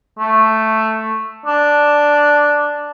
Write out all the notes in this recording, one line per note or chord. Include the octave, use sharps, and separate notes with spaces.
A3
D4